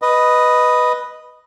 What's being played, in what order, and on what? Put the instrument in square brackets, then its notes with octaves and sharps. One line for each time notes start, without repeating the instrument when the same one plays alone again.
[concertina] B4 D#5